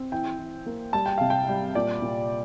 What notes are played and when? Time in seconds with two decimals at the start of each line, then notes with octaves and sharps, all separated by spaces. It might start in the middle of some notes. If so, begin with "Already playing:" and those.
Already playing: C4
0.12 E3 G5
0.39 E3
0.66 A#3
0.93 G3 A5
1.06 G5
1.18 C3 F5
1.30 G5
1.49 G3
1.75 A#2 D5
2.02 A#2